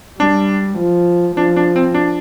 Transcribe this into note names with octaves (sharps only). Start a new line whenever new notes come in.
G3 D4
F3
F3 D4
D4
C4
D4